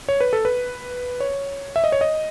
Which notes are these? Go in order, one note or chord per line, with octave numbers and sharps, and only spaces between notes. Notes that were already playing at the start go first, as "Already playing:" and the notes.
C#5
B4
A4
B4
C#5
E5
D#5
C#5
D#5